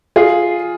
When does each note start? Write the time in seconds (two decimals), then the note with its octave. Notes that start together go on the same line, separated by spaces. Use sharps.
0.16 F4 G#4